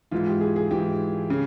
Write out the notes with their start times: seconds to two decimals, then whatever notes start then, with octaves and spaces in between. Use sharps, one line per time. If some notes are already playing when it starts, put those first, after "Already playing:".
0.11 G#2 E3 F4
0.27 G4
0.41 G#4
0.56 G#4
0.71 G#2 E3 G4
1.30 C#3